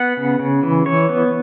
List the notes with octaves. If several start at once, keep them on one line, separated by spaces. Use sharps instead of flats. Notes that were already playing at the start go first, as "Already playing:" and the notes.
Already playing: B3 F#5
C#3
C#3
E3
E3 C#5
B3